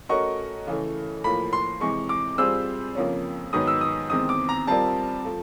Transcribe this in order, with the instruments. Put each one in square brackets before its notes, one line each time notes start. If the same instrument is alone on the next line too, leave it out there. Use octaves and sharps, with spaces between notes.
[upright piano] A3 C#4 F#4 A#4 D#5 [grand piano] C#6
[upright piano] C#3 E3 A3
[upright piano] A2 F3 A#3 [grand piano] B5
[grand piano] C6
[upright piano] C3 E3 G#3 [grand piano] C#6
[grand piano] D6
[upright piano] G3 C4 F4 G#4 C5 [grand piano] E6
[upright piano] F2 C#3 F3 A#3 C#4
[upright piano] G#2 D#3 F#3 B3 D#4 [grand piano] D#6
[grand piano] E6
D#6
[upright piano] E2 C3 D#3 G#3 C4 [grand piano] D#6
[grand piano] D6
A#5
[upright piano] G3 C4 F4 A#4 D5 [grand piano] A5
[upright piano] F3 A3